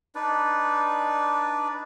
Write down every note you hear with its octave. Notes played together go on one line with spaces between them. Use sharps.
D4 D#4 B4 D5